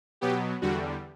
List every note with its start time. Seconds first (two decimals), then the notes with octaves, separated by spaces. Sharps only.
0.21 B2 F#3 B3 G4
0.62 E2 D3 G3 F#4